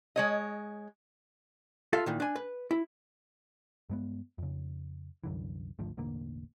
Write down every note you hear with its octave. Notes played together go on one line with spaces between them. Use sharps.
G#3 C#5 D#5
F4 A4 E5 F5
A#2 D#3 E3
D4 G#5
B4
E4
G2 G#3 B3
F2 C#3
C2 F#2 D3 E3
G#1 D2 F3
E1 A1 D3 A#3